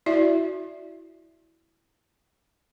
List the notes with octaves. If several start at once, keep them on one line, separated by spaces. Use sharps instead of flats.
E4 F#4 D5 E5